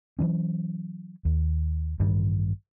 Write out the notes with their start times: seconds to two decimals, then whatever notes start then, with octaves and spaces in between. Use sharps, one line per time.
0.19 E3 F#3 C#4
1.25 D#2
2.00 A1 G2 D#3 G3